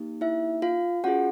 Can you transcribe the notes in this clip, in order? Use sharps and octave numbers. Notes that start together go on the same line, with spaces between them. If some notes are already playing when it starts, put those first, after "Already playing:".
Already playing: A#3 D#4 G4
E4 E5
F4 F5
C#4 F4 F#4 G#4 F#5